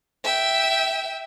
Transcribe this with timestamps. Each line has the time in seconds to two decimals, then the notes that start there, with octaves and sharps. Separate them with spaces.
0.24 E5 G5